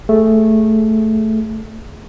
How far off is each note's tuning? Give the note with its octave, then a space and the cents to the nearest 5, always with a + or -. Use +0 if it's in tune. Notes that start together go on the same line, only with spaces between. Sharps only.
A3 +0 G#4 +0